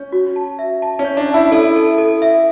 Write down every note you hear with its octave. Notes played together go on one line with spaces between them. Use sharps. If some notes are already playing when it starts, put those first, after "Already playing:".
Already playing: C#4 C#5
F#4
A5
E5
A5
C#4
C#5
D4
A5
E4
E4 A4
A4
A4
E5